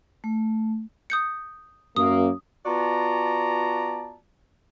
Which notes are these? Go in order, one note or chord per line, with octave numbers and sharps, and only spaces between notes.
A3
D#6 G6 C#7
F#2 A#3 D#6
B3 F4 F#4 D5 A5 A#5